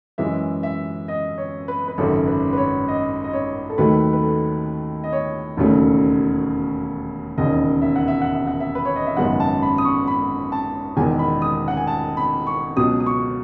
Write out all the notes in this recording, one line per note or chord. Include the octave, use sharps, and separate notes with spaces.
F#2 E3 G#3 E5
E5
D#5
C#5
B4
B4
G#1 F#2 C#3 A4
B4
B4
C#5
D#5
D#5
C#5
A4
D#2 D#3 F#3 A3 B4
B4
A4
D#5
C#5
E1 D#2 C#3 F#3 A3
E1 D#2 C#3 D#5
E5
F#5
E5
F#5
E5
F#5
E5
B4
C#5
D#5
E5
G#1 F#2 C#3 G#3 B3 F#5
A5
B5
D#6
C#6
B5
A5
E1 E2 D#3 G#3 G#5
B5
D#6
F#5
G#5
A5
B5
C#6
C#2 B2 F#3 D#6
D#6
C#6